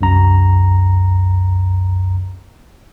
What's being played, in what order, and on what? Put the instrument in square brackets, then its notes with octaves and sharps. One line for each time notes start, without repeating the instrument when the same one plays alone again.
[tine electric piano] C2 F#2 A#5